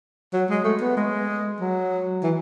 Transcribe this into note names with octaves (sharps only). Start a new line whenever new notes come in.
F#3
G#3
A3
B3
G#3
F#3
E3